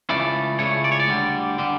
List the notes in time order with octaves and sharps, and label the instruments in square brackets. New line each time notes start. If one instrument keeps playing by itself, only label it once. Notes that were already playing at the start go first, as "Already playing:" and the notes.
[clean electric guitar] C#2 C#3 E3 A3 D5
C#2 C#3 E3 A3 C#5
D5
C#5
D5
D2 D3 G3
D3 G3